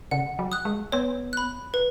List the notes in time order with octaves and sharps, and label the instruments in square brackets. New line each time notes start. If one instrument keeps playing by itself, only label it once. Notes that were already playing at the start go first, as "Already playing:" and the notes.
[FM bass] C#3 [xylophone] F#5
[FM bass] F#3
[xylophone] D#6 F#6
[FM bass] G#3
[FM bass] B3 [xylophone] C#5
[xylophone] B5 F#6
B4